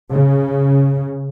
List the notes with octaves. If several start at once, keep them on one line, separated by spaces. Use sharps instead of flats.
C#3